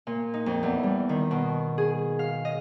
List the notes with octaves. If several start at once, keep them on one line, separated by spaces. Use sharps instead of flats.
A#2
D#4
F2
E2
G3
D#3
B2
G#4
F5
D#5